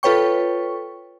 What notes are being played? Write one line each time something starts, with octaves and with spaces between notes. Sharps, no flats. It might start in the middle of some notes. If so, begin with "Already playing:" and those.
F4 A4 B4 C#5 G5 C#6